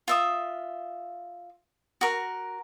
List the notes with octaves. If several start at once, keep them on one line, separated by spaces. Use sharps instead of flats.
F4 E5 D#6
F#4 A#4